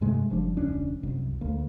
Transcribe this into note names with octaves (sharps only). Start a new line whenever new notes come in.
G2 C3 G#3 A3
F#1 F3 G3 D4
E1 C#2 C#4 D4
C2 F#2
D2 A#3